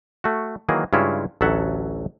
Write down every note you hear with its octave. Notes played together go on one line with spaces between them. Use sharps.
A3 F#4
D#3 E3 F#3 A#3 G#4
G2 C#3 G#3 C#4 E4 F4
A1 D2 F#3 A4 E5 F#5